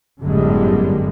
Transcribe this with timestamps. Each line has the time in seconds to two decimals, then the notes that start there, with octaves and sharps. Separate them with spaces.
0.23 G1 F#2 A2 D3 G3 G#3